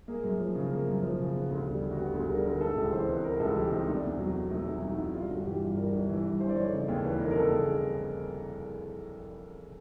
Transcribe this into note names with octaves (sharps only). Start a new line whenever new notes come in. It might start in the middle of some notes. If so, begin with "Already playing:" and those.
A#3 G#4
F#2
F3
C#3
A#3
F#2
F3
C#3
B3
D2
G3
D3
F#4
B3 G4
D2 G#4
G3 A#4
D3 A#4
G#3 A4
C#2 G4
E3 C5
C3 B4
G#3 A#4
C#2 A4
E3 G4
C3 D#4
A3 D4
E2
F#3
B2
A3 D#4
E2 E4
F#3 D#4
B2 E4
G3 F4
G1 F#4
E3 G4
G2 F4
G3 A#4
G1
E3
G2
E3 C5
D5
F1 C#5
C#3 D5
D#2 C#5
E3 B4
F1 A#4
A#4
C#3 A4
D#2 G#4